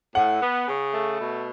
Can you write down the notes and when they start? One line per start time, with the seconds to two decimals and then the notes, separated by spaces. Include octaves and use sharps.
0.15 A2 F#5
0.41 B3
0.67 C#3
0.94 A3
1.19 B2